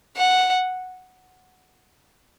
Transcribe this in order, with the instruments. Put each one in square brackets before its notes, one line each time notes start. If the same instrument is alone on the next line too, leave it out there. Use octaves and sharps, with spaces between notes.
[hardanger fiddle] F#5